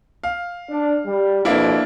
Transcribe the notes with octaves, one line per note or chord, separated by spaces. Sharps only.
F5
D4
G3
F2 B2 A#3 D4 E4